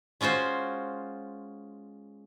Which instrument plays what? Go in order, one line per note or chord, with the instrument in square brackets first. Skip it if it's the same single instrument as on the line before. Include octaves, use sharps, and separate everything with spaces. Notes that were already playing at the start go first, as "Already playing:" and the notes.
[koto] G#3 C#4 F4 F#4 C5